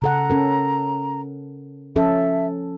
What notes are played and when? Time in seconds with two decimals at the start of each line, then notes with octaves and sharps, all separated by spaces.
0.02 C#3 A4 F#5 A#5
0.30 C#4 A4 A#4
1.96 F3 C#4 A4 E5